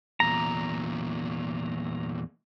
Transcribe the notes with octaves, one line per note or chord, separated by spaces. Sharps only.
E2 A#2 A#5